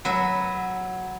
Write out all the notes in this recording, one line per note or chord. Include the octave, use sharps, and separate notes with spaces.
F#3 B4 E5